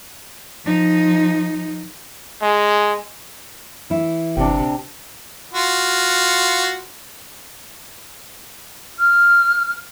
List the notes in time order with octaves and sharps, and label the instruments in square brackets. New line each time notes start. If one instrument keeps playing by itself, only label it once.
[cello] F3 D#4
[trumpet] G#3
[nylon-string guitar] E3 E4
[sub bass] G1 [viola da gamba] C3 [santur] D4 G5
[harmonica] F4 F#4
[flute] F6